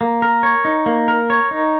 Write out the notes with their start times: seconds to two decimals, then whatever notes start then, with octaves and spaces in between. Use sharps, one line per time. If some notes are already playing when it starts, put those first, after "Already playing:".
0.01 A#3
0.22 A#4
0.43 C#5
0.65 D#4
0.86 A#3
1.08 A#4
1.30 C#5
1.51 D#4